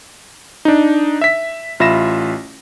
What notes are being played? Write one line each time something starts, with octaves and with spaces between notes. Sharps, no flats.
D4 D#4
E5 B6
A1 F4 E5 B5 A#6 E7